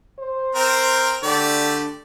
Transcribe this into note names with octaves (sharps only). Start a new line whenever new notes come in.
C5
C4 A#4
D3 A3 G4 D5